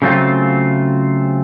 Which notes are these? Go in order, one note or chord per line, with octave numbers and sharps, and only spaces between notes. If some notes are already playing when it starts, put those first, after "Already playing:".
C#3 F#3 A3 C4 F4